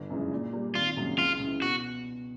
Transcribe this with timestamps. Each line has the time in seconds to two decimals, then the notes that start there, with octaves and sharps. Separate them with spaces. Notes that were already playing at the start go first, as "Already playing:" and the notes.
Already playing: G1
0.10 F#2 C#3 E3 G#3
0.31 A#2
0.53 G3 A#3
0.74 G#1 F4
0.97 F#2 C#3 F#3 A#3
1.19 C#2 F4
1.40 C#3 E3
1.62 B2 F#4